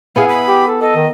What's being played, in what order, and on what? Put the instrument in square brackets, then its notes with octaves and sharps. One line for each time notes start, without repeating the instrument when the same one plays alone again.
[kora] B3 E4 G#4 [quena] F5
[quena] B5
[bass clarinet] G4
A4
[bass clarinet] A4 [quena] D#5
[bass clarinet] D#3